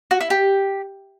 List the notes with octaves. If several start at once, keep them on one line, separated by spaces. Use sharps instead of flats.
F#4
E4
G4